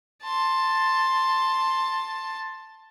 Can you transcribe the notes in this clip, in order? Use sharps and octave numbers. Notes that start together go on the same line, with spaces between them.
A5 C6